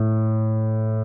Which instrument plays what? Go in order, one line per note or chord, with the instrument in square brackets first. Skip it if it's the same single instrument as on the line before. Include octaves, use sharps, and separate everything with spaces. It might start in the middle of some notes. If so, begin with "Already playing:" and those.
Already playing: [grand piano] A2